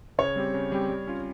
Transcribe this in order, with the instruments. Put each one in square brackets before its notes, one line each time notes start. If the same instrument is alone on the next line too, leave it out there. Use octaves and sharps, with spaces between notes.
[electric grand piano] C#3 [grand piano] C#5
[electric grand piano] G3 C4 G4
C#3
G3 C4 G4
G3
C#4 F4